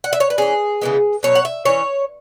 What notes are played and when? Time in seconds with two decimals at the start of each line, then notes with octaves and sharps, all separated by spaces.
0.04 F#5
0.13 E5
0.20 C#5
0.30 B4
0.38 E3 C#4 G#4
0.81 C#3 E3 G#3 B3
1.23 B2 F#3 C#4 C#5
1.35 F#5
1.45 E5
1.65 E3 C#4 C#5